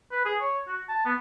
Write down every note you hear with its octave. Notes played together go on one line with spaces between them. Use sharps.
B4
G#4
C#5
F#4
A5
B3